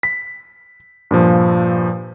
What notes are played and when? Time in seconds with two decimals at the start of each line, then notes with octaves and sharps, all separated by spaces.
0.03 B6
1.11 G2 A#2 F3